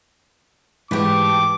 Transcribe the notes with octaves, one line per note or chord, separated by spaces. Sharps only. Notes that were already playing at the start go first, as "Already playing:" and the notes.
G#2 E3 A3 G4 B4 D6